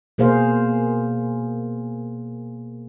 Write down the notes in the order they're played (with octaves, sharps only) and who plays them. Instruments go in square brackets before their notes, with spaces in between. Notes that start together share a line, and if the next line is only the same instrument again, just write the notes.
[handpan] B2 A#3 G#4 C5 F5